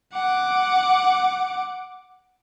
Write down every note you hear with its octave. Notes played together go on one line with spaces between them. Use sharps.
F#5 D6